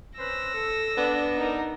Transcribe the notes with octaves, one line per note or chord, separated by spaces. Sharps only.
C#4 B4 C5 E6 A#6
A4
B3 D4 B4 D5
D#4 A#4